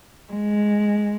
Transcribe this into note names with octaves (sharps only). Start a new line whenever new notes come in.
G#3